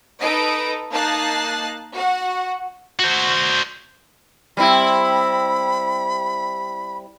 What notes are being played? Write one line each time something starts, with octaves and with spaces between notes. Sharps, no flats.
D#4 A4 B4 D#5 D7
A#3 D#4 A5 F#6 A6 C7
F#4 F#5
F#4 C5
G3 C4 E4 B5